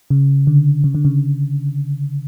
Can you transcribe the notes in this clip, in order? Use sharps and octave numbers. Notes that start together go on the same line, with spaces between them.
C#3
D3
C#3
D3
C#3